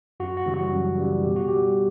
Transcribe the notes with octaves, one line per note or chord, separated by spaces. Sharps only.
F#2 F#4
F#4
C#3 E3 G3
F#4
F#2
C#3 E3 G3
B2 G4
F#4
G3 G4